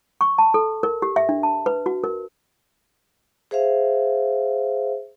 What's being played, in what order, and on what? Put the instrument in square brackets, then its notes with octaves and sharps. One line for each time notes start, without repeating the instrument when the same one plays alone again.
[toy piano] C#6
A5
A4
A#4
G4
E5
D4
A5
B4
F#4
A#4
[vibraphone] G#4 C5 E5 F5